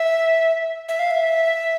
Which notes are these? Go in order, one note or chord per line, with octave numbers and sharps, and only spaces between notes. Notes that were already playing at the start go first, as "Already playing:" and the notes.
Already playing: E5
E5
F5
E5